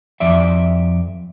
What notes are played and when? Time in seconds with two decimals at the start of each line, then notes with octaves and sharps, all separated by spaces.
0.20 F2 D5 E5